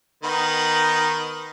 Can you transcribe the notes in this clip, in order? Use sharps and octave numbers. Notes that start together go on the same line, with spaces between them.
D#3 B3 D#4